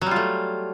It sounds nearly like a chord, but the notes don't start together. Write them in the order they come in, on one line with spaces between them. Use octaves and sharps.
F#3 G3 F4 A3